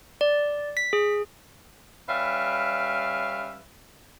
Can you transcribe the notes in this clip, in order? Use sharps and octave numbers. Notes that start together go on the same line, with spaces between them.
D5
B6
G#4
G3 C#4 B4 E5 F5